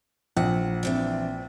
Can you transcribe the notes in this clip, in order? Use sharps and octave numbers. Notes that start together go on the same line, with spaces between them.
A#1 F#5
E3 C4 D4